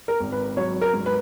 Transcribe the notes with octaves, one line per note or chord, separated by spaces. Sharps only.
A#4
G#1
B4
F#3 C#5
A#4
G#2
B4